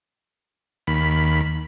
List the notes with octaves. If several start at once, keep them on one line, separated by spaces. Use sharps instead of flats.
D#2 B5